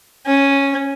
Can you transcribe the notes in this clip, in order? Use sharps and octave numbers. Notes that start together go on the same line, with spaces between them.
C#4